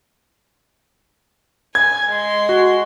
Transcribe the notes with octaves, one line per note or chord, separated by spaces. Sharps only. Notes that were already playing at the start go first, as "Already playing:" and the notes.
G#5 G#6
G#3 C6
F#4